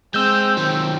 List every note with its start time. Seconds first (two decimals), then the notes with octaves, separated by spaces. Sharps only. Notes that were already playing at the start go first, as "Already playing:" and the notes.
0.14 G#3 C4 E6 G6
0.57 D#3 F#3